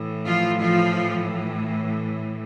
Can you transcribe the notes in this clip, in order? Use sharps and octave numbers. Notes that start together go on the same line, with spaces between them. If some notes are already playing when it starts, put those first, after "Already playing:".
Already playing: A2 E3
F3 F4
F3 F4